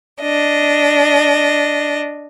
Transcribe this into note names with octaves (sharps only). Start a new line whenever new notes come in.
D4 D#5